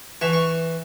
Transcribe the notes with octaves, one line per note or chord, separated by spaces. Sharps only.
E3 C#6
C#6